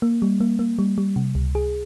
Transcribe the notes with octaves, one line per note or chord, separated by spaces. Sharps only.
A#3
G3
A#3
A#3
G3
G3
C3
C#2
G#4